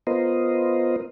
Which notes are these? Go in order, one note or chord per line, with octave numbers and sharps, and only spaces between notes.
B3 F4 A#4 C5 D#5